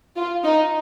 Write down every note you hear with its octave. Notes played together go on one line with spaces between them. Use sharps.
F4
D#4